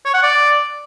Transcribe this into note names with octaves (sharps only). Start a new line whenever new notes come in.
C#5
F#5
D5